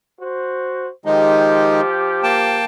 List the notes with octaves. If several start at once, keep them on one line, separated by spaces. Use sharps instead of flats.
F#4 C5
D#3 F3 G#3 D#4 G4
A#3 G5 A5